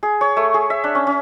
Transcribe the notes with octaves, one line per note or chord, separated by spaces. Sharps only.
G#4
C#5
A3
G#4
E5
D4
C#4
C#4